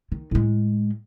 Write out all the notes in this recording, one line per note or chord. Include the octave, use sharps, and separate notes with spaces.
D#3
A2 G#3